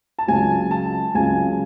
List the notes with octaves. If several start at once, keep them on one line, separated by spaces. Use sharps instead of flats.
A5
C#2 C#3 F#3 G#5
A5
C#2 C#3 F#3 G#5